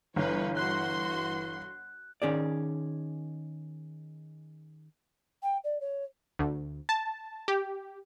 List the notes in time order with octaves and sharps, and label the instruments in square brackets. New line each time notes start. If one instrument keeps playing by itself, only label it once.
[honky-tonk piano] G1 [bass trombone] E3 [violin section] F4 B4 C#5
[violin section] F#4 C6 [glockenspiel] F#6
[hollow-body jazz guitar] D#3 C#4 G#4 D5
[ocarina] G5
D5
C#5
[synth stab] D2
A5
G4